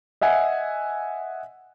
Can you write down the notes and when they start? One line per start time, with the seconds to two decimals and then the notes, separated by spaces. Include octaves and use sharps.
0.21 D#5 E5 F#5 G#5